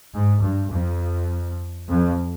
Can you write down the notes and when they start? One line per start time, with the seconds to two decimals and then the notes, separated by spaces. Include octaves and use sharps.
0.14 G#2
0.42 G2
0.71 F2
1.88 F2